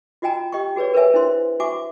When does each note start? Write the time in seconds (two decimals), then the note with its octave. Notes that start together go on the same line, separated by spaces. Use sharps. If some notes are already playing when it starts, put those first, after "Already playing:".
0.22 F4 F#4 D#5 G5 G#5 A#5
0.52 G4 D#5 G5 C#6
0.76 F#4 G#4 B4 C#5 D5
0.94 A#4 B4 C#5 E5 G#5
1.14 D4 E4 C5 C6
1.60 F#4 E5 G#5 C#6 D6